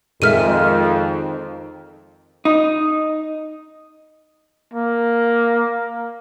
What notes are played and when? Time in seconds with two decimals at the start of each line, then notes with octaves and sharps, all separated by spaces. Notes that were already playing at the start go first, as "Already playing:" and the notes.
0.22 F2 D#3 G#3 E5 F6 D#7
2.45 D#4
4.74 A#3